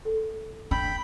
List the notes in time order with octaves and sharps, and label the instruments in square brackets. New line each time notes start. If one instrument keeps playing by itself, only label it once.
[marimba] A4
[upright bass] D4 [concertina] G5 B5